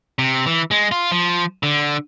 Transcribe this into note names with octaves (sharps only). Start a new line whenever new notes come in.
C3
E3
G#3
F4
F3
D3